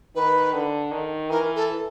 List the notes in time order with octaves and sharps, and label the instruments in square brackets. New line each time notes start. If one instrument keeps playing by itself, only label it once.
[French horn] D#3 [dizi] B4
[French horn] D3
D#3
[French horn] E3 [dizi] A#4
[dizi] A4